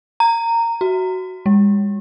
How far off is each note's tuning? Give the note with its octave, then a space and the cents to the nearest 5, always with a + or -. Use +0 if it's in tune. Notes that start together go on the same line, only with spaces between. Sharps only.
A#5 -15
F#4 +10
G#3 -45